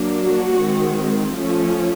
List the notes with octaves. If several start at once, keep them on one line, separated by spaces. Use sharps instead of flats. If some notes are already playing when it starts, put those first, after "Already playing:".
Already playing: F#3 A#3 D4
F#4
D#3 G#3 C4
F3 A3 C#4